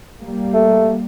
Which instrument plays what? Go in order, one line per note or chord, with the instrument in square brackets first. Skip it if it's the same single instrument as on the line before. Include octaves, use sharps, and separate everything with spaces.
[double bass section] G3 A#3
[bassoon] A3